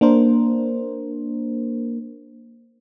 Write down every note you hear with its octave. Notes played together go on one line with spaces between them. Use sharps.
A#3 D4 A#4 C5